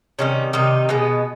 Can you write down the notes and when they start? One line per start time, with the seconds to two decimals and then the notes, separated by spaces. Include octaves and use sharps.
0.19 C3 D#3 G3 C#4
0.53 C3 D#3 G3 D#4
0.89 B2 G#3 B3